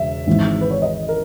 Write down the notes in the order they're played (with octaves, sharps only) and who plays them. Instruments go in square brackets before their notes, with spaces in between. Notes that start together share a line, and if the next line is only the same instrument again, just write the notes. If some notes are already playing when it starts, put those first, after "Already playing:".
Already playing: [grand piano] E1 C#3 [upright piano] E5
[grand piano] G#1 G#2 E3
[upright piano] B4
C#5
D#5
A#4